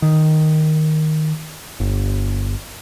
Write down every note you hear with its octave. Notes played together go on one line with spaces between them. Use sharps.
D#3
G1